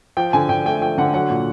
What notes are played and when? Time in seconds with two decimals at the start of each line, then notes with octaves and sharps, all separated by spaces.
0.17 F3 G5
0.33 D3 G#5
0.49 D3 G5
0.65 A3 G5
0.81 F3 G5
0.98 D3 F#5
1.14 F#3 F#5
1.30 A#2